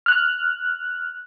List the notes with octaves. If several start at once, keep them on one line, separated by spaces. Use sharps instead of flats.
F6 F#6